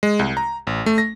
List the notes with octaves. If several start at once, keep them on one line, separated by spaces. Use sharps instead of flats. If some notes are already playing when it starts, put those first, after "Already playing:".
G#3
C2
A#5
A1
A3
A#6